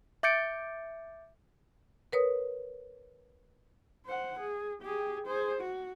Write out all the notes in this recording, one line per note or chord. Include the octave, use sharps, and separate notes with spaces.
E5 D6 G6 A6 C#7 D7
A#4 B4 C#5 D#6
C5 F#5
G#4
G4 G#4
G#4 C5
F#4